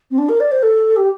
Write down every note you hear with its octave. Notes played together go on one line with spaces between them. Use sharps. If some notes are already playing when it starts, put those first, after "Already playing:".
C4
D4
A#4
D5
C5
A4
G4